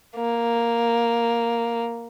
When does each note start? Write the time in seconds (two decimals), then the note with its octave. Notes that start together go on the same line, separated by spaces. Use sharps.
0.16 A#3